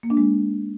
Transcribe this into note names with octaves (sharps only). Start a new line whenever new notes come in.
A#3
D4
G#3